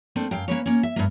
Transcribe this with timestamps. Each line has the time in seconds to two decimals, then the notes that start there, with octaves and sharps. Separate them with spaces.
0.16 A3 A#3 C4 D4
0.31 F#2 F5 G5
0.48 A#3 C#4 B4 C#5
0.66 A#3 C#4
0.83 E5
0.96 G2 A#3